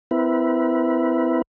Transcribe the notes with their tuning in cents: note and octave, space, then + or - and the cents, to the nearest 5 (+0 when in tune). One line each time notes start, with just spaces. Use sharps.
C4 -45 E4 +0 B4 -35